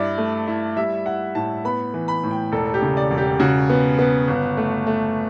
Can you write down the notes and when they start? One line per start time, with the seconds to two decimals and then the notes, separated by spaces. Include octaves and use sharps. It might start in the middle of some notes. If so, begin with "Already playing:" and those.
Already playing: G2 E4 D5
0.18 A3
0.48 E4
0.77 G3 E5
1.06 E4 F#5
1.35 A2 A5
1.65 B3 B5
1.94 E3
2.08 B5
2.23 A2
2.31 G5
2.52 E1 A4
2.74 G4
2.82 C#3
2.97 D5
3.11 E1
3.18 G4
3.40 C#3 F#4
3.70 B3
3.99 B3
4.28 G1
4.57 A3
4.87 A3